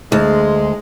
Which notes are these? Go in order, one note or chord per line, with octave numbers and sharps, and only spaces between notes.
D2 G#3